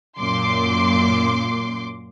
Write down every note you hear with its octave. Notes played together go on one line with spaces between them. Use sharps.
F#2 A#2 C6 D6